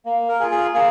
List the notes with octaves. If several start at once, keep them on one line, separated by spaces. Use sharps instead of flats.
A#3
A#4
G#4
F4
G#4
A#3 G#4